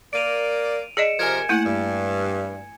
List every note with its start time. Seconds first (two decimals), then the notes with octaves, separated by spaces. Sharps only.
0.13 A#3 D5 D7 D#7 F7
0.97 G#4 D5 D#5 C#7 D7 E7
1.19 C3 F3 A#4 G#5 G#6
1.49 A3 A#3 E4 F#5
1.65 G2